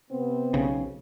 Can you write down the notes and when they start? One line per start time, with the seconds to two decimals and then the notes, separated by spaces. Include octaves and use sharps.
0.11 C3 B3 C4
0.54 B1 C#3